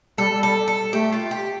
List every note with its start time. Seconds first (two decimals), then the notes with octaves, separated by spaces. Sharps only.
0.18 G3 A4
0.37 G3
0.43 A4
0.68 A4
0.93 A3 G4
1.12 F4
1.31 G4